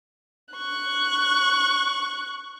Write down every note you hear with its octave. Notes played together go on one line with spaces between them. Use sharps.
C#6 F#6